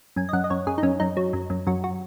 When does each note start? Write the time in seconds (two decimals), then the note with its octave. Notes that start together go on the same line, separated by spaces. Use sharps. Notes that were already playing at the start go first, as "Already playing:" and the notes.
0.16 F#2 G#5
0.29 D#5
0.33 F#2 F#5
0.44 D#5
0.50 F#2 C#5
0.67 F#2 G#4
0.78 D#4
0.83 F#2 C#4
1.00 F#2 D#4
1.17 F#3
1.33 F#2
1.50 F#2
1.67 F#2 F#4
1.84 F#4